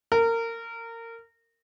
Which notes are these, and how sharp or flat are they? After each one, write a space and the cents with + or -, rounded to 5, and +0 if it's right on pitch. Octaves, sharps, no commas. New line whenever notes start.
A#4 -25